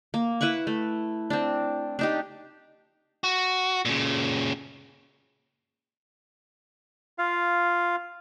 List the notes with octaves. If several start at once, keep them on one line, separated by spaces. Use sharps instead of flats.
A#3
E4 B4 F#5 C#6
A3
C4 D4
D4 D#4 G4
F#4
A#2 C#3
F4 F5